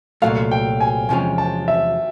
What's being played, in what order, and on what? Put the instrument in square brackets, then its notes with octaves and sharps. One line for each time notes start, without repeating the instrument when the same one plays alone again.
[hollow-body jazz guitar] C2 A#2 F#3 A3 [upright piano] F5
[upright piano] G5
G#5
[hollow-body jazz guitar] E2 C3 F3 G#3 C#4 [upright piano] G#5
[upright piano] A5
E5